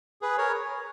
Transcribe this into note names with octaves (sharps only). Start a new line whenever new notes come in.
G#4 B4
A#4 C#5